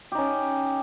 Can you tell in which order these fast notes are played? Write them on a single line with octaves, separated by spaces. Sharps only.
G4 D#4 C#4